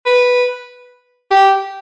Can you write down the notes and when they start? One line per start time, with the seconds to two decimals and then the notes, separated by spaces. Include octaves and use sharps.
0.06 B4
1.31 G4